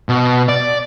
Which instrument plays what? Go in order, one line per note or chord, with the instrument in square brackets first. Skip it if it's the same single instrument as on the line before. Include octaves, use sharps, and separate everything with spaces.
[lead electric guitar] B2
D5